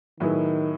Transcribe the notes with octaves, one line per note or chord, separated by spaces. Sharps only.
A2 D#3 F#3 B3 E4 G#4